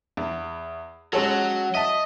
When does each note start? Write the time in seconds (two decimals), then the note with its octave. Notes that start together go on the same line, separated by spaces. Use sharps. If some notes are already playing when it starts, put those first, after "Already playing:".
0.17 E2
1.13 F#3 G#3 C#4 A4
1.75 D#5 E5 A5